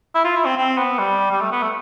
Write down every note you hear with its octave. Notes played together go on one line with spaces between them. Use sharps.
E4
F4
E4
C4
C4
B3
G3
G3
A3
B3
A3